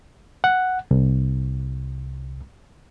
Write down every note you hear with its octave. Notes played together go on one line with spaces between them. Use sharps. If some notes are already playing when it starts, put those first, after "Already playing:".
F#5
C2